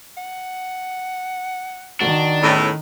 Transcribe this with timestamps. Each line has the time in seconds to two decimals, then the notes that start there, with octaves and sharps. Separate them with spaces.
0.17 F#5
2.00 D#3 D4 F#4
2.42 E2 A2 C#4